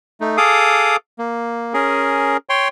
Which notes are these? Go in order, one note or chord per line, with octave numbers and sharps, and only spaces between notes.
A3 D#4
G#4 A4 F5 D6 D#6
A#3
C#4 G#4 A#4
C#5 G5 C6